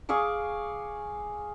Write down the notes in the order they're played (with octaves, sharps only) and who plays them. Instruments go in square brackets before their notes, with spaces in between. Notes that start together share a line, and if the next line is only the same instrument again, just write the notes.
[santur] G#4 F5 C#6 D6